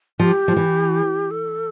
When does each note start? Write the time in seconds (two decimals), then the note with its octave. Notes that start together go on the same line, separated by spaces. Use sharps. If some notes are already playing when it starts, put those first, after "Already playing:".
0.19 F3 G4
0.48 F3
0.56 E3
1.31 A4